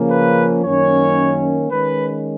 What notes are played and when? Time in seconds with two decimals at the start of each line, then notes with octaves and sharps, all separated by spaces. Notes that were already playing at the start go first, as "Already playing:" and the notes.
Already playing: C#3 F3 A#3 C#4
0.11 B4
0.63 F#2 D#3 A#3 C#4 C#5
1.70 D#3 G#3 C#4 B4